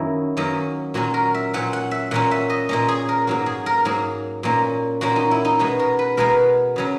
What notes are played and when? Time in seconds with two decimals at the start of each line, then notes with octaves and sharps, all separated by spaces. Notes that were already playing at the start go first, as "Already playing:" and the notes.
Already playing: F#2 D#3 A#3 C#4 E4
0.37 F#2 D#3 A#3 C#4
0.94 A#2 F#3 C#4 F#4
1.14 A#4
1.34 E5
1.53 A#2 F#3 C#4 F#5
1.73 F#5
1.91 E5
2.11 A#2 A#3 C#4 F#5
2.31 E5
2.50 D#5
2.69 A#2 A#3 C#4 D#5
2.88 G#4
3.09 A#4
3.27 G#2 F#3 A#3 F#4
3.46 G#4
3.66 A#4
3.85 G#2 F#3 A#3 G#4
4.43 A#2 A#3 C#4
5.01 A#2 A#3 C#4 F#4
5.16 D#4
5.31 E4
5.45 D#4
5.59 B2 G#3 B3 F#4
5.79 A#4
5.99 B4
6.17 B2 G#3 B3 A#4
6.76 C#3 F#3 C#4